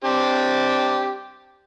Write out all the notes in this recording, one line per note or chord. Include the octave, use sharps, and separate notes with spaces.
C4 D4 G4